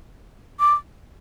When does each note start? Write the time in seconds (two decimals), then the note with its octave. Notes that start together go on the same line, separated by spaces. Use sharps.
0.60 D6